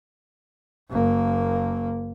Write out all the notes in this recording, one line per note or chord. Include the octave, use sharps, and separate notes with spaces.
F#1 A#3